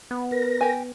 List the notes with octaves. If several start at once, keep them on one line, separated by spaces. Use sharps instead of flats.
B3
A#4 B4 A#6
G4 G#5